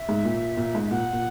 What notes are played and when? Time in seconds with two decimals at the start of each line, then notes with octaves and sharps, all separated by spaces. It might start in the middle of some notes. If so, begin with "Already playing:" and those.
Already playing: E5
0.09 G#2
0.25 A#2
0.57 A#2
0.75 G#2
0.86 E5
0.91 A#2 F#5
1.13 A#2